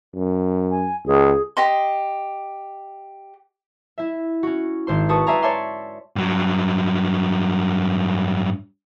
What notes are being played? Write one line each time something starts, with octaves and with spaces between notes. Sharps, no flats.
F#2
G#5
C#2 G#4
G4 D#5 C6
E4 E5
C#4 F#4
G#1 C5 C6
F#4 B4 A5 C#6 D#6
B4 D5 E5 F5 G#5 A#5
C#5 D5 E5 A5 C6 D6
G2 F#3